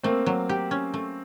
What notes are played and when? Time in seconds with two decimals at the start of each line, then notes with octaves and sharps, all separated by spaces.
0.04 A3 A#3 C4
0.26 F#3
0.49 G4
0.71 C#4
0.94 A3